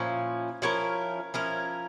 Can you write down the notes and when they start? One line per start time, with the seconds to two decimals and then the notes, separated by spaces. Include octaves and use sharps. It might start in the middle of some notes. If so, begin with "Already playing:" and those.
Already playing: A#2 F3 C#4 E4
0.62 F3 C#4 E4 A#4
1.34 F3 C#4 E4 A#4